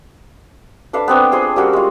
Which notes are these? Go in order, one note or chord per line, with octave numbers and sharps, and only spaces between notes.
D4 A4 B4 F5
B3 C4 D4
F4 G#4 C5 C6
G3 A#3 C#4 F#4
G#3 F4